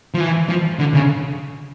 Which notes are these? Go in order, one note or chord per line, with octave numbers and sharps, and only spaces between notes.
F3
E3
F3
D3
C#3